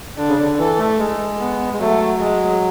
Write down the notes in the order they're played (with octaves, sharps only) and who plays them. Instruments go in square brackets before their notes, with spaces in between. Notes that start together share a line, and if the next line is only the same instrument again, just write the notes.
[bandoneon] D3 [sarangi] D4
[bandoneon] C#3
D3
[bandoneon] E3 [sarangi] A4
[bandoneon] A3
[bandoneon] G#3 [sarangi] A4
[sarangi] B3
[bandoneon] G#3
[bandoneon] F#3 [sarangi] A3
[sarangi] G#3